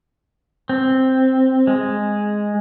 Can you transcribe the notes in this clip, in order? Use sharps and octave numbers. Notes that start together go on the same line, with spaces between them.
C4
G#3